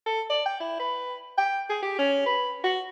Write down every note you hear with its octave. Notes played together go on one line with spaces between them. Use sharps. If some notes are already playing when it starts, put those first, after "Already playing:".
A4
D5
G5
E4
B4
G5
G#4
G4
C#4
B4
F#4